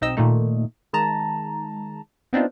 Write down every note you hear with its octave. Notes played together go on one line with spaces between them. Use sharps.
B1 C4 D#4 D#5 E6
A#2 D#3 A3 D#4
D#3 G#3 A5 A#5
B3 C4 D4 D#4 F4